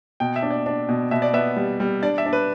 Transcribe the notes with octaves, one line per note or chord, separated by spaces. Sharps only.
B2 G5
E5
D4
D5
D4
B2
B2 E5
D5
B3 E5
G3
G3
D4 D5
E5
D4
B4